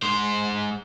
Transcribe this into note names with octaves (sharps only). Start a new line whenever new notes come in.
G#3 C5